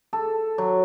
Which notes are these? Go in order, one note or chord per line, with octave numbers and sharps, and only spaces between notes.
A4
F#3